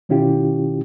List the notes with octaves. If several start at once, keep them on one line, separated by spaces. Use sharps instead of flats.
B2 D#3 C#4 E4 F4 G4